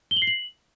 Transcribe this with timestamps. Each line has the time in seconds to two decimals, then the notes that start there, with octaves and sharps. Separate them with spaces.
0.11 G7
0.16 F#7
0.22 C7
0.27 F#7